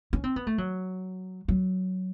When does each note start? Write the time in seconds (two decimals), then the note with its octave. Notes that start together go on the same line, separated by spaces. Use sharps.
0.13 C#4
0.24 C4
0.36 B3
0.47 A3
0.58 F#3
1.48 F#3